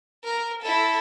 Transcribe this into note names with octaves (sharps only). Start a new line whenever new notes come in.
A#4
E4 A4